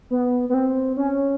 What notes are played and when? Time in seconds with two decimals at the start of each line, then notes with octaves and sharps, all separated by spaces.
0.10 B3
0.49 B3
0.54 C4
0.97 C#4